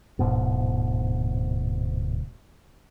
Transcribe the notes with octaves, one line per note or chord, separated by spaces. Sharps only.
D1 G#2 B2